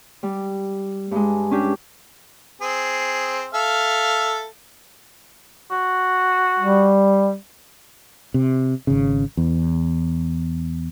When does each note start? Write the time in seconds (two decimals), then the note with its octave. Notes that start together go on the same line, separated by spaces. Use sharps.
0.23 G3
1.11 G2 G#3
1.51 C#4 D4 G4
2.61 C4 G#4
3.54 A4 E5 F5
5.71 F#4
6.59 G3
8.34 C3
8.87 G#1 C#3
9.37 E2